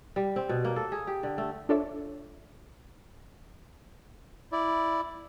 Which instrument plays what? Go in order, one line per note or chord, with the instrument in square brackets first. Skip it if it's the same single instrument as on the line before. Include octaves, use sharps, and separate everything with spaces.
[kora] G3
C4
B2
A#3
A4
G#4
G4
D3
A3
[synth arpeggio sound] D4 F4 A4 C#5 D5 E5
[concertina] E4 D5